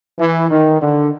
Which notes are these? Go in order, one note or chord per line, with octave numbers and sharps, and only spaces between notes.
E3
D#3
D3